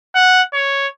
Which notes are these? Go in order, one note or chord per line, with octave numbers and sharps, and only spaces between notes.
F#5
C#5